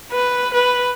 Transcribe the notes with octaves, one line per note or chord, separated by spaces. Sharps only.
B4
B4